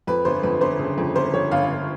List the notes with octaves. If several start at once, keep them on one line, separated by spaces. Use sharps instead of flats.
F2 B4
G1 C5
F2 B4
G1 C5
C#3
F2
G1 C5
F2 C#5
G1 F5
G1